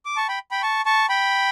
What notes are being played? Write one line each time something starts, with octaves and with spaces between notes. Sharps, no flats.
D6
A5 C#6
G5 B5
G5 B5
A5 C#6
A5 C#6
G5 B5